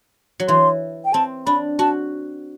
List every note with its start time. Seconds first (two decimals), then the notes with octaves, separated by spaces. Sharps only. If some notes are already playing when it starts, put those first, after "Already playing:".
0.40 F#3
0.48 E3 C6
1.05 G5
1.13 C4 A5
1.47 D4 B5
1.79 F#4 A5